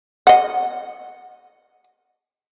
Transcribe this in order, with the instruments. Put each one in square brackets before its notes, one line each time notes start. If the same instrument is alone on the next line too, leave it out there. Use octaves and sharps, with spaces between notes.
[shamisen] D#5 F#5